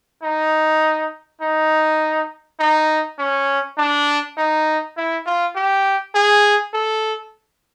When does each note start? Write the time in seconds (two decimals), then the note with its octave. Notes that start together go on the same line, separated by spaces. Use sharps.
0.23 D#4
1.41 D#4
2.60 D#4
3.19 C#4
3.78 D4
4.37 D#4
4.97 E4
5.26 F4
5.56 G4
6.15 G#4
6.74 A4